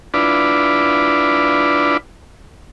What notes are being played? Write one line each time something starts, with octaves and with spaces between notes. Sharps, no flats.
D4 E4 F4 B4 D5